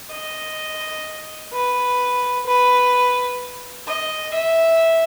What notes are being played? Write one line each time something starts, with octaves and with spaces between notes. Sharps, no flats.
D#5
B4
B4
D#5
E5